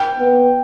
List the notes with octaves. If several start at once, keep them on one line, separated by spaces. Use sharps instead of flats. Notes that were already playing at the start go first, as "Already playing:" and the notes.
Already playing: G5
B3